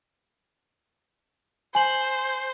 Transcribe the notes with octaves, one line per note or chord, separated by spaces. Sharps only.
C5 G#5 F#7